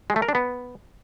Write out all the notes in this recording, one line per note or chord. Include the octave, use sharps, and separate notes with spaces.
G#3
A3
A#4
D4
B3